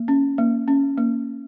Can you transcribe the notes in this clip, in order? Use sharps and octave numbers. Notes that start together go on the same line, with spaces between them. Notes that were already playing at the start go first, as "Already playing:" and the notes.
Already playing: A#3
C#4
A#3
C#4
A#3